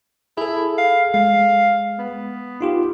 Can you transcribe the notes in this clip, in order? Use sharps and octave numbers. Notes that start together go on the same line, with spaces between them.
E4 G#4 A4
F5
G#3 F5
B3
D#4 F4 G4